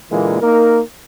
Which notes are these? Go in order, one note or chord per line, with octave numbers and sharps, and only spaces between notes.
A#2 D3 E3 G#3 A#3
A#3 D#4 A#4